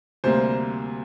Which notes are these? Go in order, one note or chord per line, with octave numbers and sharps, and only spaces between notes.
D2 C3 G3 A#3 C5